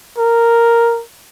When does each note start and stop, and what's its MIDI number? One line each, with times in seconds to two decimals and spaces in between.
0.18 1.02 70